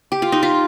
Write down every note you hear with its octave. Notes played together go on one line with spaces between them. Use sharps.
G4
F4
D#4
F4